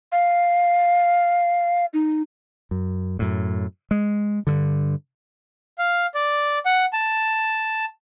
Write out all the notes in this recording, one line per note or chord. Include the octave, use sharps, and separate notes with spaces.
F5
D#4
F#2
F#2 A2
G#3
G2 D3
F5
D5
F#5
A5